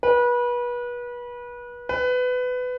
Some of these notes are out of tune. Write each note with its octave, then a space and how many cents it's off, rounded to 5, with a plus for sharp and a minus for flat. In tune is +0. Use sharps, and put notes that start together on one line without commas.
B4 -30
B4 +20